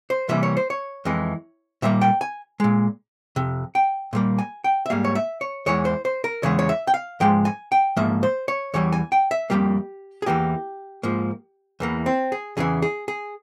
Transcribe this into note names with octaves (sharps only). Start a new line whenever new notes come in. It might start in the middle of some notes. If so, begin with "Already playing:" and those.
C5
C3 E3 G3 A#3 E5
C#5
C5
C#5
F2 E3 G#3
A#2 G3 A#3 E5
G5
G#5
A#2 G#3
F2 C3
G5
A#2 G3 A#3
G#5
G5
E5
G#2 G3 A#3 F5
C#5
E5
C#5
E2 E3 G#3 C#5
C5
C5
A#4
E2 C#3 E3 G#3 C#5
C#5
E5
G5
F5
G#2 F3 G#3 G5
G#5
G5
G#2 F3 A#3 E5
C5
C#5
E2 E3 G3 C#5
G#5
G5
E5
F2 C#3 G3 A#3 G4
G#4
E2 E3 A#3 G4
G#2 F3 A#3
E2 E3 A#3
C4
G#4
E2 C#3 E3 G#4
G#4
G#4